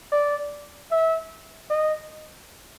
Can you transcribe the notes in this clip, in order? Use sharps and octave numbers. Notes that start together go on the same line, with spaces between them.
D5
E5
D#5